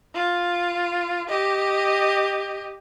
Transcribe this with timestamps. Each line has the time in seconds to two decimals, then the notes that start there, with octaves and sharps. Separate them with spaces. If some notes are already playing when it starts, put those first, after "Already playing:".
0.15 F4
1.29 G4 D#5